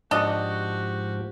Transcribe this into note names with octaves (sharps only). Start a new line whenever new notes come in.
G#2 F3 D4 F#4 G4 D5 D#5